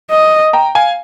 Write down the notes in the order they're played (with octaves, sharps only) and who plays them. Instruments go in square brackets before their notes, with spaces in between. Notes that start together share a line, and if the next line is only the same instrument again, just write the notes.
[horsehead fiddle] D#5
[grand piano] G5 A#5
F5 G#5